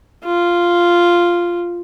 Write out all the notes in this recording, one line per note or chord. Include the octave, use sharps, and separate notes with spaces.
F4